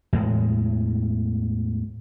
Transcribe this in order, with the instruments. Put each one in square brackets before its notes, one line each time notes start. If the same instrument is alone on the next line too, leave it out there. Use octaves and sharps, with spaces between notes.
[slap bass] E2 A2 G#3